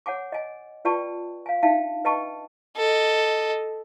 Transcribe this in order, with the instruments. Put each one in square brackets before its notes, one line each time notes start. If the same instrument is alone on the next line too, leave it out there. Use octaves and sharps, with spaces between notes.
[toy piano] C#5 F#5 G#5 D6
D#5 G#5
F4 B4 D5 G5 A5 C#6
F5 G#5
D4 D#4 E5 F5 G5 A5
B4 D#5 G5 A5 C#6
[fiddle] A4 D#5